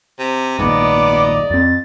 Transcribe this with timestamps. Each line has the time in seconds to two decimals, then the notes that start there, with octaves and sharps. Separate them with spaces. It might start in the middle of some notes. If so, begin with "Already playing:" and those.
0.19 C3
0.59 A#1 D#2 G#2 B3 D5 D#5 A#5 D6
1.50 F2 C4 A6